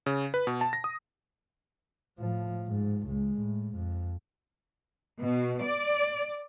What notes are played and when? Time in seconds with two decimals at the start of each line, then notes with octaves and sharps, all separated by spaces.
0.06 C#3
0.34 B4
0.47 B2
0.61 A5
0.73 A#6
0.84 D#6
2.18 A2 F3
2.67 G#2
3.08 C#2 G#3
3.38 A2
3.75 F2
5.20 B2
5.63 D5